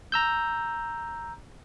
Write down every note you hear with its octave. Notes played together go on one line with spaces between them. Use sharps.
A#5 E6 G6